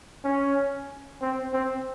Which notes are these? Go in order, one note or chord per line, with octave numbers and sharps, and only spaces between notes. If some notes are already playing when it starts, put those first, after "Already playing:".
C#4
C4
C4